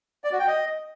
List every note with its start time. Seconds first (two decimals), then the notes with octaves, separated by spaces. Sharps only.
0.24 D5
0.32 F#4
0.40 G5
0.47 D#5